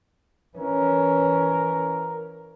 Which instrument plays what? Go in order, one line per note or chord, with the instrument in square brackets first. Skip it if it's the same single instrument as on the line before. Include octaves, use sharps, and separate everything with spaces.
[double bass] E3 C#4 [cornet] A#4